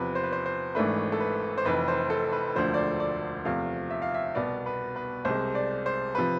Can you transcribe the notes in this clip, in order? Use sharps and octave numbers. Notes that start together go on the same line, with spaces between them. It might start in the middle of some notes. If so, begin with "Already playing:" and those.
Already playing: E2 C3 F3 B4
C5
B4
C5
C5
G#1 G#2 E3 A3 D4 B4
A4
B4
C5
F1 F2 E3 B4
C5
A4
B4
E1 D2 D3 F3 C5
D5
C5
D5
E2 C3 F3 A3 F5
E5
F5
E5
C2 B2 B3 D5
B4
B4
C2 C3 G#3 C5
D5
C5
C3 F3 B4